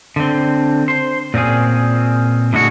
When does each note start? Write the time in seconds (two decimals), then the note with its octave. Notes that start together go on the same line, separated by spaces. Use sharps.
0.16 D3 C4
0.88 C5
1.34 A#2 C4 C#4 G#4
2.53 A2 D3 G#3 F#4